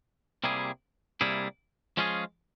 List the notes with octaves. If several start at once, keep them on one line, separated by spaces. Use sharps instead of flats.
C3 G3 A#3 E4 G#4
C3 G3 A#3 E4 G#4
F3 G#3 C#4 F4 G#4